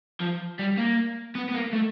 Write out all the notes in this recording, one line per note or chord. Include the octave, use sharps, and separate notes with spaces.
F3
G3
A#3
B3
B3
A#3
A3